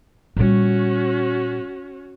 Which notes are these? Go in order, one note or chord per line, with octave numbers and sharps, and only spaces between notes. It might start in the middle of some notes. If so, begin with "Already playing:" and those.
A#2 G3 C#4 F#4